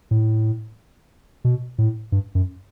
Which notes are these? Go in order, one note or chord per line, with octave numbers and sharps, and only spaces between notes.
A2
B2
A2
G2
F#2